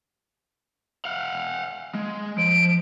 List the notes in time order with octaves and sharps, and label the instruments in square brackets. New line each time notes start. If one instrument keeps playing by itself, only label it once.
[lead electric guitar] F5 F#5
G#3
[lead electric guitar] F3 [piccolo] D7